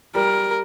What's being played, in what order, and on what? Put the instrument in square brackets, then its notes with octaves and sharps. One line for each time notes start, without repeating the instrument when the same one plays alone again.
[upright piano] G3 [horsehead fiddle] A#4